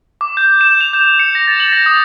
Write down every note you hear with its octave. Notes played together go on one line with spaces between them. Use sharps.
D6
G6
E7
F7
G6
C#7
A#6
A6
F#7
A#6
D#6